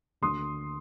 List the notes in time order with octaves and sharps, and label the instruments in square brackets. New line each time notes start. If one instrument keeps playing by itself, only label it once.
[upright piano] D2 D3 C6 D#6